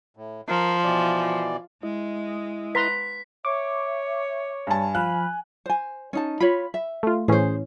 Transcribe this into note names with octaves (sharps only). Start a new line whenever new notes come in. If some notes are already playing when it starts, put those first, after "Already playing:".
A2
F3 A#4
B2 E3 D5
G#3 E4 D#5
B4 A#5 C6 B6
C#5 E5 C#6 D6
G2 G#5 A5
F3 F5 B5 F#6
C5 G#5
C#4 D#4 A5
F4 C#5 B5
E5
A3 F4
A2 E3 C#4 G#4 C5